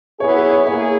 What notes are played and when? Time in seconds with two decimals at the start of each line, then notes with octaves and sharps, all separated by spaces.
0.20 F#3 B3 E4 G#4 C#5
0.36 B4
0.50 C#5
0.66 A#3 E4 G#4 C#5